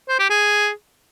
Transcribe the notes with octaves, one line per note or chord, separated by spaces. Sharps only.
C5
G4
G#4